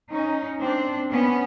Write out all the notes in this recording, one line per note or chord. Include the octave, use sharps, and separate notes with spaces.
C#4 D#4
C4 D4
B3 C#4